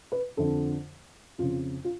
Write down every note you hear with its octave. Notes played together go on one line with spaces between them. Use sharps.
B4
F2 D3 A4
F2 C#3 F4
F4